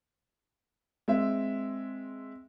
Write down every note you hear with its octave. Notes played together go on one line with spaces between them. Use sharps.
G#3 C4 E5